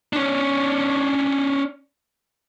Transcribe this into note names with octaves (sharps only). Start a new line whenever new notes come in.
C#4 D4